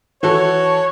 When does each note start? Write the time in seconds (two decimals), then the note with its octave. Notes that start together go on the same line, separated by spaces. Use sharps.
0.23 E3 F#4 A4 C#5